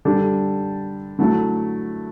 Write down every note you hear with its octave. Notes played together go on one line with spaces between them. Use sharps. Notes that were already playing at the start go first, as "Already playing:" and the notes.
D3 G3 D4 A4
D3 F#3 A3 E4